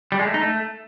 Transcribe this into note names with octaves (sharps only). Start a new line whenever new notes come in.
G3
G#3
A3
D#4
A3